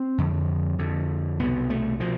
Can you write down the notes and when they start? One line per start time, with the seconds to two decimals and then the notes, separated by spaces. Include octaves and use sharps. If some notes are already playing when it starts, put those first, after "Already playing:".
Already playing: C4
0.18 F2 D3
0.79 F2 D3
1.39 C2 B2 B3
1.70 A3
2.00 B2 F3